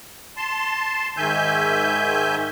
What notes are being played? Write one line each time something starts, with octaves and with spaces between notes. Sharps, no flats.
A5 C6
G#2 D#3 E5 G#5 G6